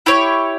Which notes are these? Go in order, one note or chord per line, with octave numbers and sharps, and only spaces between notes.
E4 G4 C#5